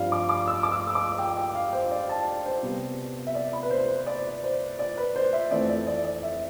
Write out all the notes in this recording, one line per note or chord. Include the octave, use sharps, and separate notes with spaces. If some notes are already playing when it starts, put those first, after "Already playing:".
Already playing: G2 F3 C4 D5 F5
D6
D6
E6
D6
E6
E6
D6
G5
G5
F5
C5
D5
A5
F5
C5
C3 G3 B3
E5
D5
B5
B4
C5
C5
D5
C5
D5
B4
C5
E5
F2 E3 A3 C4 D5
D5
D5
D5
E5